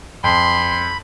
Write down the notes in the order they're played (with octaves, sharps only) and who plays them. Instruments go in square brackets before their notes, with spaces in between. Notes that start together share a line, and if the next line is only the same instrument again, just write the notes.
[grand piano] F2 [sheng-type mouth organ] B5 [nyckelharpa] C6